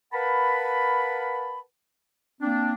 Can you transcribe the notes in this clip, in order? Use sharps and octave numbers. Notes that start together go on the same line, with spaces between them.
A#4 B4 F5 F#5 A5 B5
A#3 C4 D4